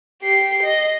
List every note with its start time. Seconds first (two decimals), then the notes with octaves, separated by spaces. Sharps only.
0.22 G4 C7
0.63 D#5